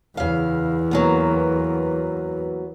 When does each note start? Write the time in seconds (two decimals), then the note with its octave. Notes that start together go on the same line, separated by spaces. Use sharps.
0.17 E2 C#3 F5
0.91 F#3 A#3 B3